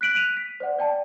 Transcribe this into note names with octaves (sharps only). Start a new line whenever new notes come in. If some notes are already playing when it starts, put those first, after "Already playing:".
F#6 B6 D7 F#7
F#6 B6 D7 D#7 F7
B6
C5 D5 F#5
D5 G5 A5